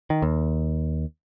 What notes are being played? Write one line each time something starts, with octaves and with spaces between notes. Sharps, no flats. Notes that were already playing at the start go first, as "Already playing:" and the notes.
D#3
D#2